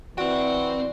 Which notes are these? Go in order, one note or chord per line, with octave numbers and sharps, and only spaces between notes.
E3 C4 F#4 D5 G5